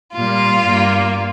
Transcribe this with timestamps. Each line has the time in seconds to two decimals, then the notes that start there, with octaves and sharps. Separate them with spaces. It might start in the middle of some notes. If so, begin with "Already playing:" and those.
0.14 A#2 G3 A#3 F4
0.64 G2 G3 A#3